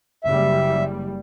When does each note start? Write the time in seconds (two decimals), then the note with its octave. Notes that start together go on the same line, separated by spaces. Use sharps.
0.24 F#1 G3 E5